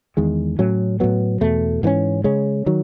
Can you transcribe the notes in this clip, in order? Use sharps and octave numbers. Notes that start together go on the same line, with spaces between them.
E2 D#3 G#3
A2 F#3 C#4
A2 F#3 B3
E2 B2 A3
G#2 E3 A3 C#4
C#3 G#3 C#4
D#3 F#3